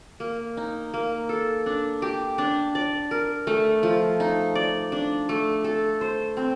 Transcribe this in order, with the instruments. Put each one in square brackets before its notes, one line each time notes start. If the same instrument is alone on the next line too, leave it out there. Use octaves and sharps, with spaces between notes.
[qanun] A#3
D#4
A#3
A4
D4
G4
D4
D5
A#4
A3
F3
D#4
D5
D4
A3
A4
C5
C4